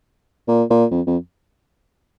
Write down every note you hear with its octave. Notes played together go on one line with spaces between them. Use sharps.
A#2
A#2
F2
F2